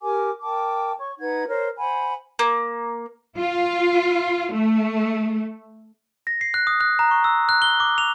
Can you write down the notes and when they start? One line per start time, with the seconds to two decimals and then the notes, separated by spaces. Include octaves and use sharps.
0.01 G4 A#4 G#5 D6
0.42 A#4 G5 A5 D6
0.98 C#5 C#6
1.19 D#4 B4 F#5 G#6
1.47 A#4 C5 C#5
1.78 C5 F#5 G#5 B5
2.39 A#3
3.37 F4
4.51 A3
6.27 A#6
6.41 C7
6.54 F#6
6.67 D#6
6.81 F#6
6.99 A#5
7.11 C#6
7.24 E6
7.49 F#6
7.62 G7
7.80 D6
7.98 F7